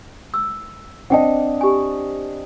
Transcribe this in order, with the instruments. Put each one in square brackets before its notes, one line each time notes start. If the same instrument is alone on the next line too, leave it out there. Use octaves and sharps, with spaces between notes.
[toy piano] E6
[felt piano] C4 D4 D#5 [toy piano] F#5 G5 A5
[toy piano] G4 G#5